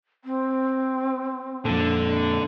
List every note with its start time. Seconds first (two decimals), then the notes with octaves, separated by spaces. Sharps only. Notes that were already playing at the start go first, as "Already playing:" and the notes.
0.25 C4
1.65 F2 A#2 D3